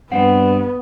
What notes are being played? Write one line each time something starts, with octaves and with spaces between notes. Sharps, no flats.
G2 G3 B3 C4 F#5